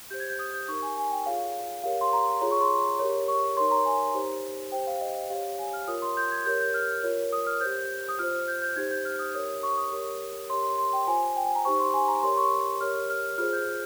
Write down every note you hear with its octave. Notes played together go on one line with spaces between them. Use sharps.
G4 C5 G6
G#6
G6
D#6
G6
D#4 G4 A#4 C#6
G#5
G#5
G5
F4 G#4 C#5 F5
G4 A#4 C#5 F5
C6
A#5
F4 G#4 C#5 A#5
C#6
C6
G4 A#4 C#5
C#6
D#4 A#4 C#5 C6
A#5
G#5
D#4 G4 C5
G4 C5 G5
F5
D#5
G4 C#5 F5
G#5
F6
F4 A#4 C#5 D#6
C6
G6
G#6
G4 A#4 C#5 G6
G6
F6
F4 A#4 C#5
D#6
F6
G4 C5 G6
D#6
F4 C5 F6
G6
G6
D#4 G4 C5 G#6
G6
F6
D#6
D#4 G4 A#4 C#5 D#6
C#6
D#6
G4 A#4 C#5
G4 A#4 C#5 C6
C6
G5
F4 C5 G#5
G5
G#5
A#5
D#4 G4 C5 C#6
C6
G#5
A#5
G4 A#4 C#5 C6
C#6
G4 A#4 C#5 F6
F6
F4 G#4 C5 F6
G6